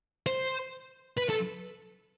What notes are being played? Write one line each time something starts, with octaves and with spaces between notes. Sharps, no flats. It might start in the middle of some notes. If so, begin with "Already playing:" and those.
C5
B4
A4